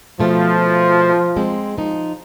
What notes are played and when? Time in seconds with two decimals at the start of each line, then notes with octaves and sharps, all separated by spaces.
0.20 B2 F3 A3 F4
1.37 G#3 C4
1.78 F3 D#4